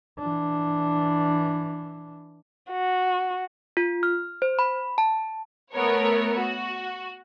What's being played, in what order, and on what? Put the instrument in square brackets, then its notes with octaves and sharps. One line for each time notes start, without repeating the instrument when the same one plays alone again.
[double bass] E3 D4
[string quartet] F#4
[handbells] F4
F6
C5
B5
A5
[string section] A3 B3 A#4 C#5
F#4